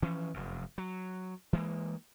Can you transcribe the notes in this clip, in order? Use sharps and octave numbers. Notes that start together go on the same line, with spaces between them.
E3 F3 C#4
F1 F#2
F#3
E3 G#3 A#3